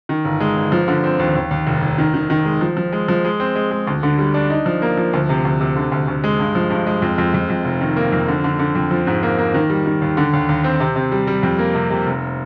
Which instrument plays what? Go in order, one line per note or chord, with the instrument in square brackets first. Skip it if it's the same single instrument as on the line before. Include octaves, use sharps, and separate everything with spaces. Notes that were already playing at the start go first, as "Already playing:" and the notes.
[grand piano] D#3
G1
G#3
G1
F3
D3
C4
D#2
D#2
D#2
F1
F1
D#3
D#3
D#3
G#3
F3
F3
G#3
F3
G#3
C4
G#3
G#3
D2
D3
G3
D4
D#4
F3
A#3
F3
D2
C3
D2
C3
D3
D2
D2
G#3
G2
F3
G2
G#3
F2
F2
F2
F2
F1
D#3
A#3
F2
D3
D3
D3
F2
F3
G#2
A#3
A#3
D#3
G3
D#3
D#2
D3
D#2
D#2
C4
C3
C3
G3
G3
F2
A#3
C3
C3
F1